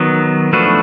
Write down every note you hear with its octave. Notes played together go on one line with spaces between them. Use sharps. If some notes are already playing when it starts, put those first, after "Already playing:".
Already playing: D#3 F#3 B3
F3 A3 D4 F#4 B4